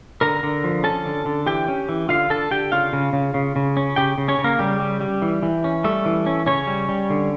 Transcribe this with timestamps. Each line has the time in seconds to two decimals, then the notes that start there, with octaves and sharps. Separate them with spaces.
0.21 D3 A#4 A#5
0.43 D3
0.64 F3
0.84 C#4 A4 A5
1.05 D3
1.25 D3
1.46 E3 G4 G5
1.68 C#4
1.89 E3
2.09 D3 F4 F5
2.30 D3 A4 A5
2.51 D3 G4 G5
2.72 C#3 F4 F5
2.93 C#3
3.13 C#3
3.34 C#3
3.56 C#3
3.77 C#4
3.96 C#3 G4 G5
4.18 C#3
4.28 C#4 C#5
4.38 C#3
4.44 A#3 A#4
4.59 C#3 G3 G4
4.80 G3
5.01 G3
5.22 E3
5.43 E3
5.64 C#4
5.84 G3 A3 A4
6.05 E3
6.27 C#4
6.46 C#3 C#4 C#5
6.67 G3
6.89 G3
7.10 D3